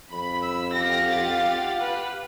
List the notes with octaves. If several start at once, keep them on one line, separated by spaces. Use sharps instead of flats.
F2 B5
E6
G4 F5 F#5 A#6
F4 A6
B4